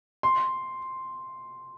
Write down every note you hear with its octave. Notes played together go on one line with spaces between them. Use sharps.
C6